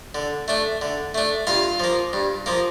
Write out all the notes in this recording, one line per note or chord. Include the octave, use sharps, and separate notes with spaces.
D3
A3 D4
D3
A3 D4
G2 F4 F5
F3 A#3
G2
F3 A#3